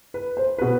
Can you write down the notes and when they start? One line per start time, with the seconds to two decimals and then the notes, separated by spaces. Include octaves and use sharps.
0.14 B4
0.37 C5
0.58 B2 B4